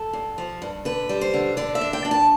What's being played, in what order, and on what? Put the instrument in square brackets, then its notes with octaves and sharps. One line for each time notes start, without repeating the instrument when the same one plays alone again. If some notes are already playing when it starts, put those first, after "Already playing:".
Already playing: [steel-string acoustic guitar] A4
G2
F3
G2
D3 B4
G3
C5
D3
D3 D5
E5
D4
G5
D4
A5